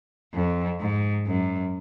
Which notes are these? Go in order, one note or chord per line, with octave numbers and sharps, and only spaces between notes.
F2
G#2
F#2